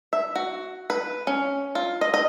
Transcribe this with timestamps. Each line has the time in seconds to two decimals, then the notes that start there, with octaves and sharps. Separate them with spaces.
0.13 E5
0.35 F#4
0.90 B4
1.27 C#4
1.75 F4
2.01 D#5
2.14 D#5